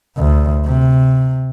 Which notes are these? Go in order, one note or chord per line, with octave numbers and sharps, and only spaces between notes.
D2
C3